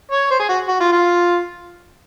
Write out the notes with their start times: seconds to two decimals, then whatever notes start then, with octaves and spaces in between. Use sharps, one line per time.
0.12 C#5
0.31 C5
0.40 G#4
0.49 F#4
0.68 F#4
0.81 F4
0.92 F4